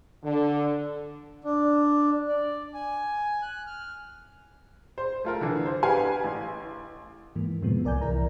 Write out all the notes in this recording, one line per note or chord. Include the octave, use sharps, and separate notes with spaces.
D3
D4
D5
G#5
F#6
F6
C5
A3 F4 A#4
D3 E3
C5
D4 G4 B4 F5 F#5 G#5
A1
G#2 E3 A#3
F#2 A2 C3 F3 G#3 B3
C2 A#4 D5 G#5 G6
C2 E3 E4 A#4 A#5